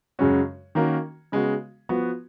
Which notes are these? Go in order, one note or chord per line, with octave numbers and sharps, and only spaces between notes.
F#2 C#3 G#3 C#4 F#4
D#3 A#3 C#4 F#4
C#3 G#3 B3 F#4
F3 B3 F#4